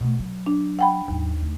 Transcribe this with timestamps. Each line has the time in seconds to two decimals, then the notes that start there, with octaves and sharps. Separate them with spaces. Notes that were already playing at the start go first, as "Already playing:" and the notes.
0.01 B2 A3
0.20 F#3
0.46 D4
0.79 F#5 G5 B5
1.08 D#2 G#2 F#3
1.43 D2